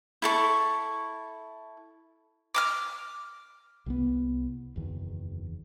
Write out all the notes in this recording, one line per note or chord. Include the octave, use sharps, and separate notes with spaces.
E4 A4 C#6
D6 D#6 F6
C2 G3 B3
F#1 E2 D#3